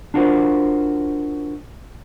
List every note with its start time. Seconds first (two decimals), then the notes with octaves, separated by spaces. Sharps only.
0.14 D4 F4 F#4 A#4 C5